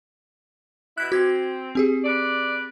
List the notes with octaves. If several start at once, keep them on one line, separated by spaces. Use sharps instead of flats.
B2 E4 F#6 B6
C4 F#4 G#6
C4 G4 G#4
B4 D5